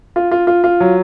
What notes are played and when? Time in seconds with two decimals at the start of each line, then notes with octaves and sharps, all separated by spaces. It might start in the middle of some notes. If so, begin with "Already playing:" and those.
0.16 F4
0.31 F4
0.47 F4
0.64 F4
0.80 F#3